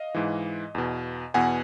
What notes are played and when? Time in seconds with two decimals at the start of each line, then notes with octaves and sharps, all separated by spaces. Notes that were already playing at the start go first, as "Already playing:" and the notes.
Already playing: D#5 F5
0.14 G#2 E3
0.75 E2 B2
1.34 E2 B2 F#5 G#5